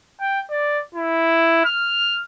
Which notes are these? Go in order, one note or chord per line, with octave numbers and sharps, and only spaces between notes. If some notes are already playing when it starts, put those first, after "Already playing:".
G5
D5
E4
F6